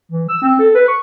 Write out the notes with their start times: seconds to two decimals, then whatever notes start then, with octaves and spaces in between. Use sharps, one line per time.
0.12 E3
0.29 E6
0.42 C4
0.59 A4
0.75 B4
0.88 C#6